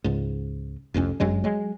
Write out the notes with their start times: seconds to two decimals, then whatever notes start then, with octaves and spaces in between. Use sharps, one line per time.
0.04 C#2 G#2
0.94 F1 C2 F2 C#4
1.20 G1 F#2 F#3 G#3
1.44 F#3 G#3